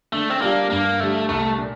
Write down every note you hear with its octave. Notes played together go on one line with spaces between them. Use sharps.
D3 A3
C4
G3 A#3 D4 F4
G2 A#3
D3 G3 A3
C2 A3
A#2